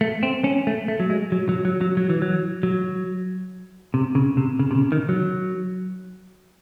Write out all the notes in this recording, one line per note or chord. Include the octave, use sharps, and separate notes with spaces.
A3
C4
C#4
A3
A3
F#3
G#3
F#3
F#3
F#3
F#3
F#3
E3
F#3
F#3
C3
C#3
C3
C#3
C3
C#3
D#3
F#3